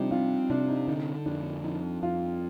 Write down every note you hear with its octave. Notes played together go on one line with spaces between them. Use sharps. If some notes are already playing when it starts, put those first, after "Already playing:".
Already playing: C3 F3 G3 D4 D#4
C4 F4
C3 D4
D#4
D3 D#4
F2 D4
F3 D#4
F2 F4